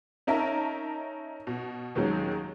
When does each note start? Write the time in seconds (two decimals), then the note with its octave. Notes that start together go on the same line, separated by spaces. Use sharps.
0.27 C#4 D#4 A#4 E5 A5
1.47 B2
1.95 D#2 D#3 F#3 G#3 C#4